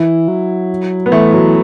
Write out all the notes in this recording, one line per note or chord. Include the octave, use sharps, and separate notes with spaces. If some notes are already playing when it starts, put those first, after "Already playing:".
Already playing: E3 E4
F#3
B3
E3 A3
F#3